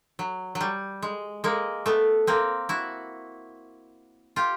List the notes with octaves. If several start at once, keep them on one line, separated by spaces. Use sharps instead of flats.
F#3
F#3
G3
G#3
G#3 A#3
A3 B3
A#3 C4
E4 F#4
F4 G4